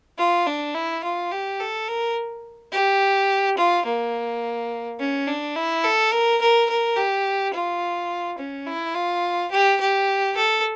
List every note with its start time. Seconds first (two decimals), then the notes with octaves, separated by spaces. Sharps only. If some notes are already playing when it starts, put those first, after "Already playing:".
0.18 F4
0.46 D4
0.75 E4
1.04 F4
1.32 G4
1.60 A4
1.88 A#4
2.73 G4
3.58 F4
3.85 A#3
5.00 C#4
5.28 D4
5.56 E4
5.84 A4
6.12 A#4
6.41 A#4
6.70 A#4
6.97 G4
7.54 F4
8.39 C#4
8.67 E4
8.95 F4
9.52 G4
9.81 G4
10.37 A4